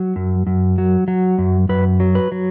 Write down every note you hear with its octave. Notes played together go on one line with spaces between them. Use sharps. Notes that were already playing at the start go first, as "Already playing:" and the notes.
Already playing: F#3
F#2
F#2
F#3
F#3
F#2
F#2 B4
F#3
B4
F#3